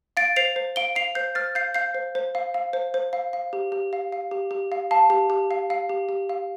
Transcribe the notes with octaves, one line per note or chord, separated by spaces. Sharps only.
F5 A6 D7
C5 C7 F7
C5
F5 D7 G7
F5 C7 F7
C5 G6 C7
C5 F6 A6
F5 G6 C7
F5 G6 C7
C5
C5
F5
F5
C5
C5
F5
F5
G4
G4
F5
F5
G4
G4
F5
F5 A5
G4
G4
F5
F5
G4
G4
F5